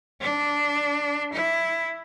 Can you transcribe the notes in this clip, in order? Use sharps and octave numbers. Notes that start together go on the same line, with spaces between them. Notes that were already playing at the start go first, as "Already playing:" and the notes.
D4
E4